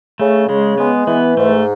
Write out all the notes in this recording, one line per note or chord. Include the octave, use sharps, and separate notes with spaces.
C#3 A3
C#3 G#3
G#3 B3
E3 B3
G#2 A3